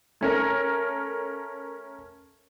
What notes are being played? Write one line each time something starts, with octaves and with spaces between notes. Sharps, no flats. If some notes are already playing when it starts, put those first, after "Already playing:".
A3 C#4 A#4